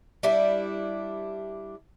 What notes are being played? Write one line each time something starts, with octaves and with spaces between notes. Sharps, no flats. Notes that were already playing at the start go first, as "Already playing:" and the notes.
G3 D4 E4